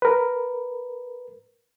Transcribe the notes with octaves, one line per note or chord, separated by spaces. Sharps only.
A#4 B4